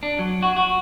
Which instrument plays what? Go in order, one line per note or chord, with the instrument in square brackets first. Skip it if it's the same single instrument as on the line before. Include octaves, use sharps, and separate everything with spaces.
[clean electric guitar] D4
F#3
F#4
F#4